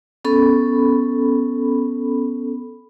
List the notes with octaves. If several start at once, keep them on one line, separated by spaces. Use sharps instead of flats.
B3 C#4 A4 B5